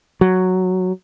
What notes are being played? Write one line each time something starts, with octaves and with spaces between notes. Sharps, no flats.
F#3